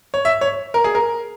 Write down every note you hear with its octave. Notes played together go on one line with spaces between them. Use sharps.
C#5
E5
C#5
A#4
G#4
A#4